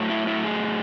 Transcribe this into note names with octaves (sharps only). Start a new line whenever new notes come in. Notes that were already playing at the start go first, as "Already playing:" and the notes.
Already playing: A2 F#3 A3
E4
E4
G#4